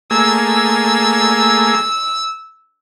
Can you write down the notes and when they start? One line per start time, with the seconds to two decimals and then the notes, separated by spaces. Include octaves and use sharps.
0.11 A3 A#3 G#4 E6